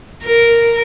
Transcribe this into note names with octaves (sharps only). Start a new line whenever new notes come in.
A#4